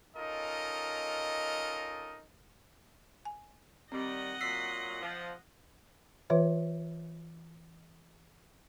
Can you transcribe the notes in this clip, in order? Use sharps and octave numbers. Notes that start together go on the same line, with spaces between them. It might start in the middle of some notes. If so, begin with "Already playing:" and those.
C#4 D#4 F4 A4 A#4 D#5
G#5
D#3 G3 C4 D#5 F#5
A#2 F#3 E6 B6 C7
F3
E3 F4 B4 C#5 E5